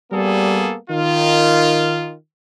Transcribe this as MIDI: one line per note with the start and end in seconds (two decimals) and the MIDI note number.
0.12 0.75 55
0.12 0.75 58
0.12 0.75 59
0.12 0.75 68
0.12 0.75 69
0.90 2.13 51
0.90 2.13 65